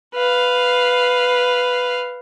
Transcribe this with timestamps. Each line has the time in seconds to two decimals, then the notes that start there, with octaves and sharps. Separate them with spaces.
0.15 B4 F5